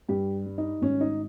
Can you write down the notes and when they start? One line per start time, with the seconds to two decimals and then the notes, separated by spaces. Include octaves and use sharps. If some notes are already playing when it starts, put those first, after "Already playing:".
0.09 G2 G4
0.46 G3
0.58 D#4
0.82 G#1 C#4
1.01 D#4